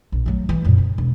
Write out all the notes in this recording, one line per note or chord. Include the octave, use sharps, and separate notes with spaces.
A#1
F#3 A3
E3 G3
F#2 A#2
C#3
E1